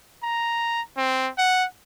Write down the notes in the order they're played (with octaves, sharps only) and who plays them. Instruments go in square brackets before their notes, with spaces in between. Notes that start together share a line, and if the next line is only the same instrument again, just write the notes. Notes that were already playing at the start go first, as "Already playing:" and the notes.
[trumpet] A#5
C4
F#5